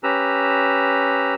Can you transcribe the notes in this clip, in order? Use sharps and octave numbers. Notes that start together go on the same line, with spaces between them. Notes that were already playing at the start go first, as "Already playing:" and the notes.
C#4 G4 B4 A#5 E6